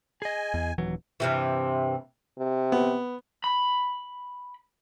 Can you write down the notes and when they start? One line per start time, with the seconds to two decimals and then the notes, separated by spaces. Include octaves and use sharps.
0.22 G#4 D#5 G#5
0.54 E2
0.78 D#1 E3 F#3
1.20 G2 C3 E3
2.38 C3
2.72 B3
3.44 B5